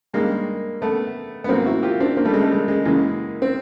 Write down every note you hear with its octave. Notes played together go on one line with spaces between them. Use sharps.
G2 D#3 G3 G#3 A#3
A3 B3
B3
G#2 D#3 F#3 A#3 C4
E4 F#4
F4 G4
C4 D4
A#3 C4
G3 A3
G#3
G3 A3
G#3
G#3
F#2 C#3 E3 G#3 A#3
C4